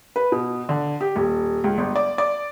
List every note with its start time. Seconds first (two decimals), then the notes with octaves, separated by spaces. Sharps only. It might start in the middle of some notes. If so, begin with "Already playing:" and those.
0.16 B4
0.32 B2
0.69 D3
1.01 G4
1.16 D#1
1.64 C#2
1.78 G1
1.96 D5
2.18 D5